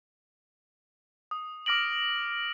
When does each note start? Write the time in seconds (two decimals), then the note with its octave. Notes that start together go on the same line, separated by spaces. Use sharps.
1.31 D#6
1.66 D6 F6 A#6 D7 F#7